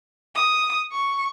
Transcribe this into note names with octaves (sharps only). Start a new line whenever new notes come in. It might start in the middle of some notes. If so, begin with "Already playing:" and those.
D#6
C#6